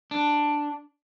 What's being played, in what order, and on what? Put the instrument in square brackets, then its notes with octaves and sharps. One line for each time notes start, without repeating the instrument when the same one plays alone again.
[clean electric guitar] D4